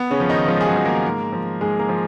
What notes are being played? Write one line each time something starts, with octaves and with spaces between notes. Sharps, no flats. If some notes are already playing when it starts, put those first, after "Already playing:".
Already playing: B3
C#3 C#4
F3
D#3 D#4
G#2 F3 F4
G#4
F#3 F#4
F3
A#3 A#4
G#2
F3
G#2 G#3 G#4
A#3 A#4
F3